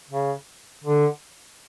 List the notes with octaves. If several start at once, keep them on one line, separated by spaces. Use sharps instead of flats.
C#3
D3